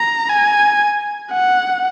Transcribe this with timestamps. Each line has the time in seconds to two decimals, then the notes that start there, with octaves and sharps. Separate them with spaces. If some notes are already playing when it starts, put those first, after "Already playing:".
Already playing: A#5
0.29 G#5
1.32 F#5